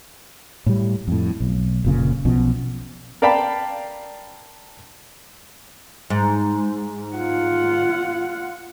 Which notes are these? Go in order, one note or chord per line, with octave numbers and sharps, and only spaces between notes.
A2 G3
F2 A2
B1
F1 A#2 C#3
B1 B2 F3 C#4
A#4 D5 F5 G5 A5 B5
G#2
F4 F#5